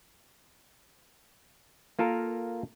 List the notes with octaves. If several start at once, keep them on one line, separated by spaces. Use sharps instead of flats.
A#3 F4 A4 A#4